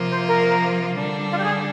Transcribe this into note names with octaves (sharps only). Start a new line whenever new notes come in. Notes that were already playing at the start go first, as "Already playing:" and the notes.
Already playing: C3 F3 A#3 F4
C5
A#4
D3 G3 D4
F4
G4
G#4